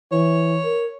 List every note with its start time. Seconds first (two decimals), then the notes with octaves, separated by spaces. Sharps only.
0.12 E3 C#5
0.64 A#4